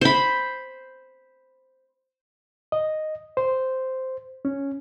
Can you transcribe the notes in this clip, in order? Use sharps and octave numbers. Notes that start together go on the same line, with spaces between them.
C5 B5
D#5
C5
C#4